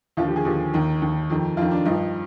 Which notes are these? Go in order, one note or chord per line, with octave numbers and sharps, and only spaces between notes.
D#2 D3 F3 F4
G4
G#4
D#2 D3 F3 G4
D#2 D#3
D#2 D#3
F2 D#3
F2 D#3 F4
D4
G2 F3 D#4